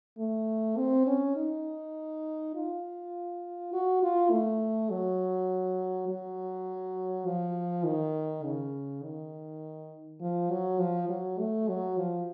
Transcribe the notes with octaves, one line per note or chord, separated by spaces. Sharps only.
A3
C4
C#4
D#4
F4
F#4
F4
A3
F#3
F#3
F3
D#3
C#3
D#3
F3
F#3
F3
F#3
A3
F#3
F3